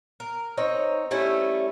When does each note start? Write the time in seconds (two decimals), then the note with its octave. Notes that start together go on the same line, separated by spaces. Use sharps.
0.20 A#4
0.57 C4 D#4 C#5
1.11 G3 A3 C#4 E4